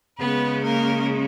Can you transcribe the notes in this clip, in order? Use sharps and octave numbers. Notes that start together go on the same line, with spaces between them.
C#3 G#3 B3 B4
A#3 A#4